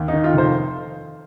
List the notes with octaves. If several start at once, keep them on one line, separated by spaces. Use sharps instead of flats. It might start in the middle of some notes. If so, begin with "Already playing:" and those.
Already playing: D#2
D#4
D#3
F4
F1 C5